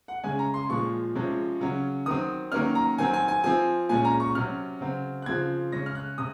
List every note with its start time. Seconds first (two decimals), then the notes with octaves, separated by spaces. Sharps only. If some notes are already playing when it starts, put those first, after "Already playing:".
0.08 F#5
0.24 C#3 G#3 C#4 G#5
0.39 A#5
0.54 C6
0.69 A#2 F3 G#3 C#6
1.15 C3 F3 G#3 C#4
1.60 C#3 F#3 C#4
2.06 D#3 F#3 C4 D#6
2.52 D#3 F#3 A#3 C#4 F6
2.75 A#5
2.98 D#3 F#3 C4 G#5
3.14 G#5
3.28 G#5
3.44 F3 C4 G#5
3.89 A#2 G#3 C#4 G#5
4.05 A#5
4.20 C#6
4.35 C3 F#3 C#4 F6
4.81 C#3 F#3 C4
5.22 F#6
5.26 C#3 F3 C4 G#6
5.72 C#3 G#3 C#4 A#6
5.86 F6
5.95 F#6
6.18 C3 D#6